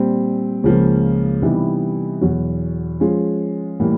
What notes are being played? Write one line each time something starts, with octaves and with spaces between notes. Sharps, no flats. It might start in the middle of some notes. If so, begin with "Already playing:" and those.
Already playing: A#2 G3 C4
C#2 C#3 F3 A#3
C3 E3 G3 B3 D#4
E2 B2 F#3
F3 G#3 C#4 F4
A2 E3 G3 A#3